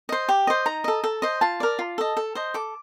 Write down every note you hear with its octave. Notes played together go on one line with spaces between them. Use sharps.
C5 D#5
G4
C5 D#5
D#4 A#5
A4 D#5
A4
C5 D#5
F4 A5
A#4 D5
F4
A4 D#5
A4
C5 D#5
A4 D6